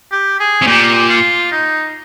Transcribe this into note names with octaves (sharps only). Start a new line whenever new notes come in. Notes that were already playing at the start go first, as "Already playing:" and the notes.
G4
G#4
C3
A#2 G4
F4
D#4